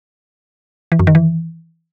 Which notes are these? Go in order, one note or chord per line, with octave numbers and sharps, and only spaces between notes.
E3
F#2
D#3
E3